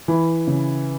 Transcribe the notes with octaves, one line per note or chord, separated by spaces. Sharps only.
E3
C#3